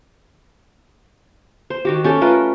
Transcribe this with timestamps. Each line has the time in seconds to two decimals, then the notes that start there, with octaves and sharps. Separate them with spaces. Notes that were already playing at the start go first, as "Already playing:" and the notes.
1.70 C5
1.85 D#3 F#4 G4
2.04 C#4 G4 A4
2.21 A3 F4 A#4 B4